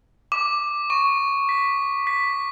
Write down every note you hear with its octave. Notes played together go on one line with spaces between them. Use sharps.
D6
C#6
B6
B6